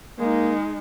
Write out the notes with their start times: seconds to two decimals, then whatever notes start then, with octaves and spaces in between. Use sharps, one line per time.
0.19 G#3 A#3 D#4